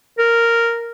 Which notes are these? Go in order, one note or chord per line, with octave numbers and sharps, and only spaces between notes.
A#4